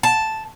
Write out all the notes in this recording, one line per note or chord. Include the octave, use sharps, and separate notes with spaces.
A5